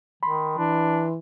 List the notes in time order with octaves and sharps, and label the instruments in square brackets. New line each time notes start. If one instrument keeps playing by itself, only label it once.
[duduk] D#3 [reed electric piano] B5 C6
[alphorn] E3 [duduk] D4